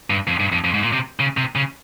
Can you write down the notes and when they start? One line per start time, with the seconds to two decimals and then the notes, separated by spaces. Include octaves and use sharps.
0.10 G2
0.27 F2
0.40 G2
0.52 F2
0.64 F2
0.74 G#2
0.83 A#2
0.92 C3
1.20 C#3
1.37 C3
1.56 C#3